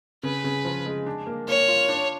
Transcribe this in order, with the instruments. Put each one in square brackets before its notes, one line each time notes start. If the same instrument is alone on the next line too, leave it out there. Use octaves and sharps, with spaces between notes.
[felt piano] C#3 [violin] B4
[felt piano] C#3
F3
G#3
D4
A#3
[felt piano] A#3 [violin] C#5
[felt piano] F4
D4